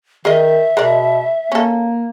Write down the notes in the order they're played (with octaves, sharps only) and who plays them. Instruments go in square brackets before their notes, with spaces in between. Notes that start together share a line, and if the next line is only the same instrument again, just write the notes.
[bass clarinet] D#3 [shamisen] G#4 A#4 D#5 [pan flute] E5
[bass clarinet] B2 [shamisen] G#3 A#4 D5
[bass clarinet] A#3 [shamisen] C#4 A4